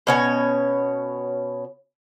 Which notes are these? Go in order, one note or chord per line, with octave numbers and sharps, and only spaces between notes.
B2 C#4 C#5